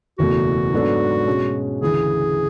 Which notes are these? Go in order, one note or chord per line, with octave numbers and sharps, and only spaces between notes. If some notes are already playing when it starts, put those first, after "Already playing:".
F#1 E2 B2 A3 F#4
G#2 F#3 B3 D4 A4
B2 G#3 C#4
D2 C#3 E3 G#4